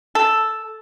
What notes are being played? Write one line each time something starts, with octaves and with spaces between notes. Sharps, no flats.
A4